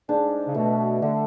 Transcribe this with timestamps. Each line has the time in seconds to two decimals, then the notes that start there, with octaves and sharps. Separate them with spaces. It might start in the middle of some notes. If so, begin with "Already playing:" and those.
0.09 G#2 D4
0.48 C#3
0.55 B2 A3
1.02 D3 A3